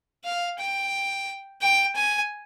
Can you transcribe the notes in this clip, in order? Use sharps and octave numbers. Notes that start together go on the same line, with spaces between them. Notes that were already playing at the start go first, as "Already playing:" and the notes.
F5
G5
G5
G#5